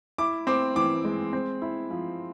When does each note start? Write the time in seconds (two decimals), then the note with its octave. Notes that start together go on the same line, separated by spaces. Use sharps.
0.18 E4 D6
0.47 C4 D6
0.76 E3 D6
1.05 G#3
1.33 C4
1.62 E4
1.90 F3